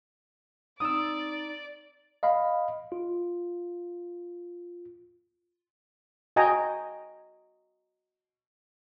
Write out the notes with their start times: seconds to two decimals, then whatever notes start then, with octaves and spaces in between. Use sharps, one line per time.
0.80 C4 D#4 D5 A#5 D#6 E6
2.23 D#5 F5 B5
2.92 F4
6.36 F#4 D#5 G5 G#5 A#5